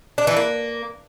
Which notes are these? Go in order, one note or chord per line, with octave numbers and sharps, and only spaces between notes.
D4
E3
A#3